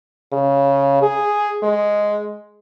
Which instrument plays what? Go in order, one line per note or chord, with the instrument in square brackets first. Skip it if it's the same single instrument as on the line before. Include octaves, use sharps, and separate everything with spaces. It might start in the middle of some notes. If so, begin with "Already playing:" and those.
[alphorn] C#3
G#4
G#3